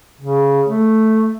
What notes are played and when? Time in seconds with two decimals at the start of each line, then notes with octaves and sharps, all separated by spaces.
0.21 C#3
0.67 A3